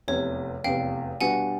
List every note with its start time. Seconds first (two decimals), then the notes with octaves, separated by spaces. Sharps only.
0.08 F1 E2 C3 C#5
0.64 F1 E2 C3 F5 G5
1.21 B2 G3 B3 D4 F#4 F#5 G#5